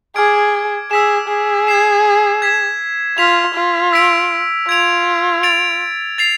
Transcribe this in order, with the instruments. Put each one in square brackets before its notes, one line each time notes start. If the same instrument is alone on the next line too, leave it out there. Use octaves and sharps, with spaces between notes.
[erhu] G#4 [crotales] D6 F6 G#6 D7
[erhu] G#4 [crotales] E6 B6 E7
[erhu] G#4
[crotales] G#6 C7 E7
G#6 B6 E7
[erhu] F4 [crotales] F6 B6 F7
[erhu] F4
[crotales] E6 B6 D7 F7
[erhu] F4 [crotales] G#6 D7 F7
[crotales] A6 D7 F7
A6 C7 F7